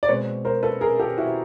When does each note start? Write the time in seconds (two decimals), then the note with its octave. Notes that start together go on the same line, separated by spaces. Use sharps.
0.03 D5
0.08 B2 G#3 C4 B4 C#5
0.45 A#4 C5
0.63 A4 B4
0.81 G#4 A#4
0.99 G4 A4
1.18 E4 F#4